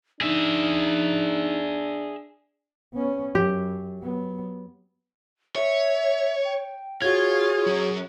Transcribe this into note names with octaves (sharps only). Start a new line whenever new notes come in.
D4 D#4 G#4 E5
B3 C#4
F#2 G4
F#3 B3
C#5 E5
G5
F4 F#4 G#4 C#5 G#6
F#3 C#4